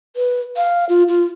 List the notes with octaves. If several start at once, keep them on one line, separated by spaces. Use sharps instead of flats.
B4
F5
F4
F4